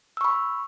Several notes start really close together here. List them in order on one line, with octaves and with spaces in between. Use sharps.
E6 C#6 B5